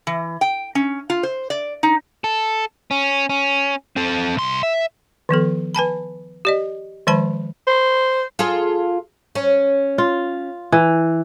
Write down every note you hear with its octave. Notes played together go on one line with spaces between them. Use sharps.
E3
G5
C#4
F4
C5
D5
D#4
A4
C#4
C#4
C4 A4
C2 C6
E5
D#3 F3 B3 A4
B4 G#5 A5 B5
G4 D5 D#5
D#3 F3 G#3 C5 A5 B5
C5
F4 G#4 A4
C#4
F4
E3